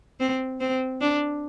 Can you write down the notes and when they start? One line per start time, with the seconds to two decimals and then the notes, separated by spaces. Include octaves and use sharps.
0.20 C4
0.60 C4
1.01 D4